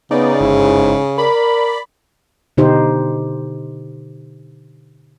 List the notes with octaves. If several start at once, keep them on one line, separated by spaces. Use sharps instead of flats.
C#3 B3 D#4 D5
G1 G#2 E4
A#4 D5 B5
B2 D3 D#4 G4 C5